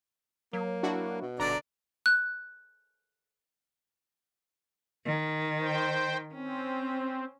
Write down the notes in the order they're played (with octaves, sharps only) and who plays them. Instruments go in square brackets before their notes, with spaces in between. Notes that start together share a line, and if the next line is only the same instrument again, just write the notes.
[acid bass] F#3 [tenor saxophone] A#3
[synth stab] D4 E4 F#4
[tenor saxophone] B2
[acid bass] D#1 [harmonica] D3 D4 D5 [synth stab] A#5
[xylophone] F#6
[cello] D#3
[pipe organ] C5 G5
[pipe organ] C4 [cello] C#4